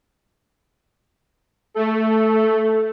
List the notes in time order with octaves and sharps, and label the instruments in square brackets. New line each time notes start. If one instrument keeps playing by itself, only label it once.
[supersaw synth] A3 [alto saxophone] A4